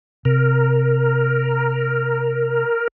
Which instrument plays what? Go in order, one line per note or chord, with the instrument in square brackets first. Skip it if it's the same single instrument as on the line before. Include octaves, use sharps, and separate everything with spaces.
[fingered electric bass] C3 [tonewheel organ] A#4